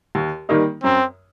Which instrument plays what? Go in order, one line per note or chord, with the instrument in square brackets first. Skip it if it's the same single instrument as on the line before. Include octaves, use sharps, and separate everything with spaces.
[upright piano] D#2
D#3 G3 A#3 D#4
[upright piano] F#2 [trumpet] C4